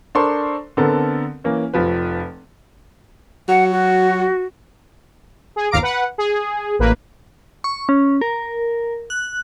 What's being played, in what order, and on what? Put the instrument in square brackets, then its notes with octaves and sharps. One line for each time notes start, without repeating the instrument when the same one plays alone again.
[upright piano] D4 A4 A#4 C5 C6 C#6
D3 B3 C4 A4 A#4
E3 A#3 C#4
F1 F3 B4
[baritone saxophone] F#3 [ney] F#5
[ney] F#4
[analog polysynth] G#4
G1 D#2 F5 A#5 D6 D7
B4 F#5
G#4
A1 A#3 B4
[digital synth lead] C#6
C#4
A#4
F#6